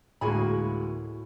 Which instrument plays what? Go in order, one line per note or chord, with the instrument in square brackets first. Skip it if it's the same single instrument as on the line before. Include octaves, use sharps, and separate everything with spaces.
[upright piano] D2 G#3 A#3 [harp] A2 [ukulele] F#4 G#4 B5